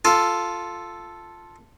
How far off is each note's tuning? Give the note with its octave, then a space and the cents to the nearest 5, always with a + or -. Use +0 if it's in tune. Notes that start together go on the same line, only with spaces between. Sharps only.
F4 +0 A4 +0